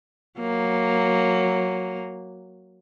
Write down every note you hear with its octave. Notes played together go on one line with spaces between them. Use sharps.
F#3 A#3